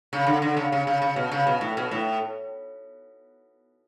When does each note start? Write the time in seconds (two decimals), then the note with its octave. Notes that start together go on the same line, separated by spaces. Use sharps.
0.13 C#3
0.27 D3
0.42 D3
0.57 C#3
0.72 C#3
0.87 C#3
1.02 C#3
1.16 B2
1.32 C#3
1.47 B2
1.61 A2
1.77 B2
1.91 A2